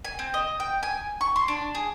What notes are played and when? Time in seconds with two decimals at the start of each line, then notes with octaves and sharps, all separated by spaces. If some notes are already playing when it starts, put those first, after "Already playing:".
0.05 G#5
0.19 C4
0.34 D#5
0.60 G5
0.83 G#5
1.21 C#6
1.36 C6
1.48 D4
1.75 G#4